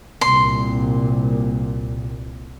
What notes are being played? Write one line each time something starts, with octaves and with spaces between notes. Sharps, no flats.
C2 A#2 C6